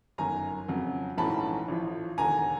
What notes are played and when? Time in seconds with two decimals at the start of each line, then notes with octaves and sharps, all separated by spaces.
0.18 G1 F#2 D#3 G#5 A#5
0.68 F2 C#3 F#3
1.18 A#1 G#2 E3 A3 C#4 A5 B5
1.68 A1 A2 F3
2.18 E1 D#2 D3 G#5 A#5